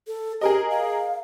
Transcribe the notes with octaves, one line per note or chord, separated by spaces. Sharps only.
A4
G4 G#4 A#4 D#5
F5